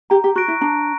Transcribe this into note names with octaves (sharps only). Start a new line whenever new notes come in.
G4 A#5
G4
F#4 C#6 F#6 A#6 D7
E4
D4 A#5